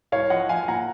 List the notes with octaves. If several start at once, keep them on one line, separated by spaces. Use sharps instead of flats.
C2 C#5 F5
F3 D#5 F#5
F3 F5 G#5
G#5
A#2 F#5 A#5